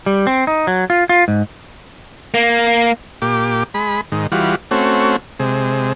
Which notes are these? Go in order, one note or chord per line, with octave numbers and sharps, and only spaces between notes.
G3
C4
D#4
F#3
F4
F4
G#2
A#3
A#2 G4 D6
G#3 B5
G#2 D#3
E3 G3 F4 F#4
A3 C4 C#4 F#4
C3 G#3